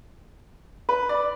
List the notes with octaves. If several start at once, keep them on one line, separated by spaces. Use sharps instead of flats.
B4
D5